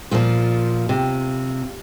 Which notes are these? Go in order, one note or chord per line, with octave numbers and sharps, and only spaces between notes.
A#2 F3 F4
C3